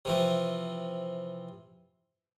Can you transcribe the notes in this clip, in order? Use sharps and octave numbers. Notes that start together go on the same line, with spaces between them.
C3 E3 F3